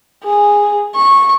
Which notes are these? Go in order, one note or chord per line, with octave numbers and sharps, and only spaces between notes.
G#4
C#6